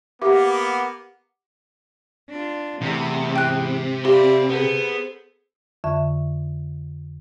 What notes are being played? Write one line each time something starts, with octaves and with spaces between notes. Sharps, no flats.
A#3 B3 G4 A#4 E5 F#5 D6
D4 F4
E2 C3 A3 E4
G#2 G5 F#6
G4 D5 E5 F5 B5 C6
B3 G#4 A4 C5
F2 D3 E5 C#6